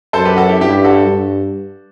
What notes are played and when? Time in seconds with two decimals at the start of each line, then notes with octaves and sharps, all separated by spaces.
0.13 F#2 A4 C5
0.25 G4 B4
0.37 F#4 A4
0.49 E4 G4
0.61 G2 E4 G4
0.84 F#4 A4
1.07 G2